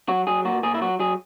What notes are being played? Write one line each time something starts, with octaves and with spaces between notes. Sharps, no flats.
F#3 F#4
F#3 G#4
A#2 F#4
A#2 G#4
E4
F#3 F#4
F#3 G#4